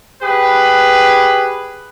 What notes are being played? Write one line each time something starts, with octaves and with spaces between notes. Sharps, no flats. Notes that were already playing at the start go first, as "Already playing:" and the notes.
G4 G#4 B4